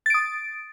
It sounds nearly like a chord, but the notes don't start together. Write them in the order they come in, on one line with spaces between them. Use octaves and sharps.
A6 D7 D#6